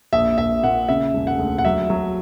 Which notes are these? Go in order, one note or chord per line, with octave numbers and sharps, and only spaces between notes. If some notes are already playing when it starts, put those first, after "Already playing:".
A#1 E5
A#1 E5
A#2 F#5
C#3 E5
E1
F#5
D2
F#5
F#3 E5
F#3